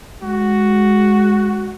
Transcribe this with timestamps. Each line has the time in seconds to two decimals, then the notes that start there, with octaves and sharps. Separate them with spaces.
0.23 G#3 F#4